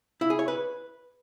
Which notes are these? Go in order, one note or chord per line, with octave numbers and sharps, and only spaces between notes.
E4
G#4
C#5
B4